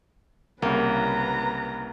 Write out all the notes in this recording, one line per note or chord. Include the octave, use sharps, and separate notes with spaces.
C2 C#3 A#3 B4 A#5